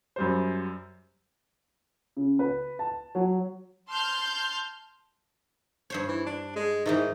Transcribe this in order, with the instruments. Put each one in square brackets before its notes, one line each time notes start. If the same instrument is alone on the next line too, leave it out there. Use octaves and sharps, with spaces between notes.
[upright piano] F#2 G3 C5
[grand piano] C#3
B4
A5
F#3
[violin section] A5 C6 F6 G6
[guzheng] G2 C5 C#5
[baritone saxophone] E3
D4
G#3
[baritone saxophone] G#2 [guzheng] D#3 E3 D#4